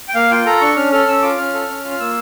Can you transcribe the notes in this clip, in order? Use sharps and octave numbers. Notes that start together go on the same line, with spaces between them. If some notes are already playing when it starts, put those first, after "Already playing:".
G5
A#3 F5
F4 G5
A4 A#5
D4 C#6
C#4 F6
A4 F6
C#4 E6
F4 D6
C#4 F6
A4
C#4
F4
F6
A#3 E6